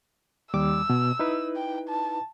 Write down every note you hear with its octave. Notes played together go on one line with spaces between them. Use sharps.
D#2 G3 D6 E6
B2
D#4 E4 B4
G5
A5